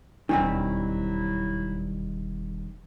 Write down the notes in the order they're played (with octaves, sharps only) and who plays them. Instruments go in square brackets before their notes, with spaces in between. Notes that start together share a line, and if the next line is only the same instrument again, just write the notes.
[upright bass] E1 D#2 [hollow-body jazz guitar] D#3 G3 C4 [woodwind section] F#3 E4 [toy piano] D4